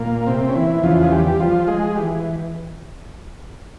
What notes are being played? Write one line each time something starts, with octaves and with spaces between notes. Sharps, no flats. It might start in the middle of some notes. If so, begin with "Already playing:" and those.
Already playing: A#2 A#3
C3 C4
C#4
E3 E4
E2 C#3 E3 F3 F4
G#4
G3 G4
F3 F4
G#3 G#4
G4
E3